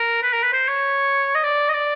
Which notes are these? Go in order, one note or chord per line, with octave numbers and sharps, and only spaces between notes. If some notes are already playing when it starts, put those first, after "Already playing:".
Already playing: A#4
B4
A#4
B4
C5
C#5
D#5
D5
D#5
D5